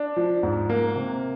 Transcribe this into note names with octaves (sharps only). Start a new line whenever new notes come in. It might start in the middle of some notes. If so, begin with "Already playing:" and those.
Already playing: D4
F3
G#2
A#3
C3